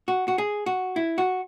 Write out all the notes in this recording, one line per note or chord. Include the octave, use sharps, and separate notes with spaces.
F#4
F#4
G#4
F#4
E4
F#4